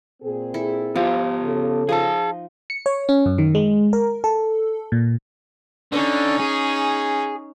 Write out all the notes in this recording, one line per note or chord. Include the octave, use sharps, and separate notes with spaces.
A#2 C4 G#4
E4 A4
F3 B3 G4
C#3 A4
F3 D#4 G#4 D#5 A5
C#7
C#5
C#4
F#2
D#3
G#3
A#4
A4
A#2
D3 C#4 D#4
G#4